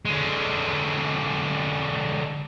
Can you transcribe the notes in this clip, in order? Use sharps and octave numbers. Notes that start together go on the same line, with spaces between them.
D3 G#3